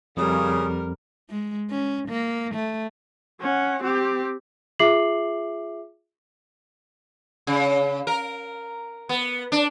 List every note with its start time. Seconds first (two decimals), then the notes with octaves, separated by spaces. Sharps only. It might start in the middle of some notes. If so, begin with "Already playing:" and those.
0.17 F2 C#3 G3 A#4 D#6
1.30 G#3
1.71 C#4
2.09 A#3
2.55 A3
3.40 C#4 F#5
3.83 C4 G4
4.79 F4 G#4 E5 D6 C7 F#7
7.47 C#3
8.07 A#4
9.09 B3
9.52 D4